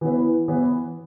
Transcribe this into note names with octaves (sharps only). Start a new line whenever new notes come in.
E3 B3 E4 B4
E3 B3 E4 B4